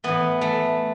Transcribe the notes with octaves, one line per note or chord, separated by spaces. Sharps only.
A2 E3 B3
A3